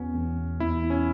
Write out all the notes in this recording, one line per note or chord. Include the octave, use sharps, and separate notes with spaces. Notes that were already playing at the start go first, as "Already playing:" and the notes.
Already playing: E2 B2 B3 C#4
E2
E2 E4
C#4